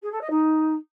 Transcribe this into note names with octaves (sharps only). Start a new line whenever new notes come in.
G#4
A4
D#5
D#4